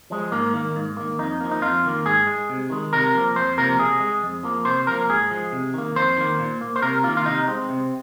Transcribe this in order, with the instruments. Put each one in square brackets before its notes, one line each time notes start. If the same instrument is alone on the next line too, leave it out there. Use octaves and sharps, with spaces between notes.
[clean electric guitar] F3 G#3
G#2 A#3
D#3 A#3
G#2
D#3 A#3
F2 D#4
F3 A#3
D#4
F2 F4
D#3 A#3
G#2 G#4
G#3
C3
D#3 G#3
C3 A#4
F3 A#3
F2 C5
C3 F3 A#3 A#4
C3 G#4
G#3
F2
F3 A#3
C3 C5
F3 A#3 A#4
G#2 G#4
F3 G#3
C3
D#3 A#3
F2 C5
D#3 A#3
A#2
A#3
C5
C3 A#4
D#3 A#3 F4
F4
C3 D#4
G#3 C4
C3